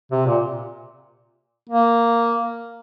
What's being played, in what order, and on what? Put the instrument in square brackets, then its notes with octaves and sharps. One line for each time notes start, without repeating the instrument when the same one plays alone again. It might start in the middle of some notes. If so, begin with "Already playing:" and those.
[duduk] C3
A#2
A#3